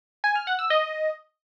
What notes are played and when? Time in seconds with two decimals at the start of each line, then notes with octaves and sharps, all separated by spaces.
0.24 G#5
0.35 F6
0.47 F#5
0.59 E6
0.70 D#5